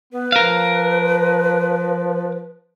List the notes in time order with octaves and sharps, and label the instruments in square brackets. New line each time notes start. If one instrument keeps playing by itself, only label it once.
[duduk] B3 [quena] B4
[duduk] F3 [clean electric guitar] A#4 F5